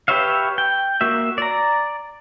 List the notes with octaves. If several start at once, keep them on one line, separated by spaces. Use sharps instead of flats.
G4 B4 C#5 E5 F5
G5
A#3 F#4 E5
D5 A#5